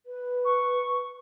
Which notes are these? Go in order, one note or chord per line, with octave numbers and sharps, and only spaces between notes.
B4
C#6